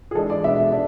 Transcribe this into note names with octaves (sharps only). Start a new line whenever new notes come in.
G#4
E3 G#3 D4 A4
D5
B2 G#3 B3 D4 E5
D4